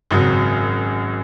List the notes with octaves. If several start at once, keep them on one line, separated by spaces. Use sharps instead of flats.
G#1 F#2 C#3 F#3